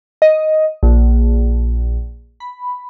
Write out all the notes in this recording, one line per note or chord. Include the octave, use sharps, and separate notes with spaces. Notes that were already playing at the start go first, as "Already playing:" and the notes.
D#5
A#1
B5